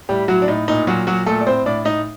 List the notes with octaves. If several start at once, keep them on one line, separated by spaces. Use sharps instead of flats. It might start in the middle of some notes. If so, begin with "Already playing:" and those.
A2 G3 G4
A2 F#3 F#4
D4
A2 D#4
A#2 D#4
A#2 F#3 F#4
A#2 F#3 F#4
A#2 A3 A4
D5
A2 C4 C5
A2 D4 D5
A2 D#4 D#5